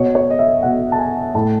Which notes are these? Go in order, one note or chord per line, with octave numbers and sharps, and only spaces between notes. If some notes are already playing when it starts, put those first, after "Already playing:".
Already playing: B2 C#5
C#5
D#5
E5
B2 F#5
A5
G#5
A2 A5